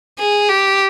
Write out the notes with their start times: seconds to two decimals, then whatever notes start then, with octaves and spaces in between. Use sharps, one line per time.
0.19 G#4
0.49 G4